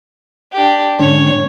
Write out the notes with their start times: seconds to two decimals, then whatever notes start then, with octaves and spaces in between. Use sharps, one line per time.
0.52 D4 G4
0.99 G#2 D3 C#4 C#5